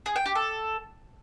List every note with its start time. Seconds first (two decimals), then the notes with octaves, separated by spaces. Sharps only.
0.06 G#4
0.16 G5
0.26 G4
0.35 A4